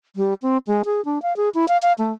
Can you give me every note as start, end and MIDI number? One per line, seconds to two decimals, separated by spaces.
0.16 0.34 55
0.42 0.58 60
0.67 0.82 56
0.85 1.04 68
1.05 1.22 62
1.22 1.36 77
1.36 1.49 68
1.54 1.68 64
1.68 1.77 77
1.82 1.92 77
1.98 2.12 57